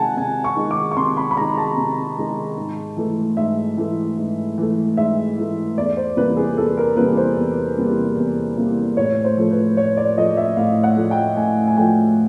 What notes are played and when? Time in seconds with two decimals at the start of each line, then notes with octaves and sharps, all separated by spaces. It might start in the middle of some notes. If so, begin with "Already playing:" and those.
Already playing: C3 D#3 G#3 F#5 G#5 A5
0.17 C3 G#5
0.44 C#6
0.57 D#3 G#3
0.71 D6
0.91 C#6
0.97 C3 C6
1.17 B5
1.31 B5
1.37 D#3 G#3 A#5
1.58 A5
1.77 C3
2.17 D#3 G#3
2.57 G#2
2.97 E3 A3
3.37 G#2 E5
3.77 E3 A3
4.17 G#2
4.58 E3 A3
4.97 G#2 E5
5.38 E3 A3
5.77 E2 D5
5.97 C5
6.17 C3 E3 G3 A#3 B4
6.37 G#4
6.57 E2 A4
6.77 A#4
6.97 C3 E3 G3 A#3 B4
7.17 C5
7.37 E2
7.78 C3 E3 G3 A#3
8.17 E2
8.57 C3 E3 G3 A#3
8.97 A2 C#5
9.24 C5
9.37 F3 A3
9.51 B4
9.77 A2 C#5
9.97 D5
10.18 F3 A3 D#5
10.37 E5
10.57 A2 F5
10.83 F#5
10.97 F3 A3
11.11 G5
11.37 A2 G#5
11.67 G#5
11.77 F3 A3 G5